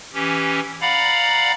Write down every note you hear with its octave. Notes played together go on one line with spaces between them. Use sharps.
E3 C#4 G4
D5 F5 F#5 A#5 B5